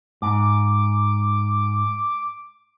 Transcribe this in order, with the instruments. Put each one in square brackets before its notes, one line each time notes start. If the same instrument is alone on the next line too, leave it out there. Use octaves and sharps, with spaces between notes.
[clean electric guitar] G#2 [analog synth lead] D6